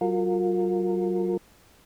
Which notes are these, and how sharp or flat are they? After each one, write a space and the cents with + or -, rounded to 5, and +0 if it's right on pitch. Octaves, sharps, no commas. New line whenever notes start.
F#3 +40 F4 +35 A#4 -25